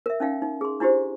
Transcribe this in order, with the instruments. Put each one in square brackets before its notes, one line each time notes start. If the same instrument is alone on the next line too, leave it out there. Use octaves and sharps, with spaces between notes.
[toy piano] A#4 E5
C#4 D#4 F5 G5
D#4
G#4 C6
D4 E4 F#4 G4 C5